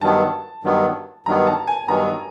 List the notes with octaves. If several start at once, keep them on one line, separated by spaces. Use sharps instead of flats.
G2 D#3 F#3 B3 A5
G2 D#3 F#3 B3
G2 D#3 F#3 B3 A#5
A5
G#5
G2 D#3 F#3 B3 A#5